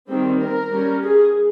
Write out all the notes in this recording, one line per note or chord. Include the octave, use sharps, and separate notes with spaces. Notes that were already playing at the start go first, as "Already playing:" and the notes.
D#3 G3 C4
A#4
G3 C#4
G#4